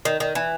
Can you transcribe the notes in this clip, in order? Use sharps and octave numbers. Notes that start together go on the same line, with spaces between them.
D#3
D#3
E3